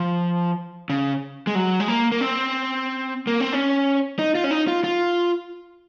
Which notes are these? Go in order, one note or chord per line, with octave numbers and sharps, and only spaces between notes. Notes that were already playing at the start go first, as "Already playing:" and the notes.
Already playing: F3
C#3
G#3
F#3
G#3
A#3
A#3
C4
A#3
C4
C#4
D#4
F4
C#4
D#4
F4
F4